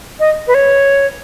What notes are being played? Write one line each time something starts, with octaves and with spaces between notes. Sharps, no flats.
D#5
B4
C#5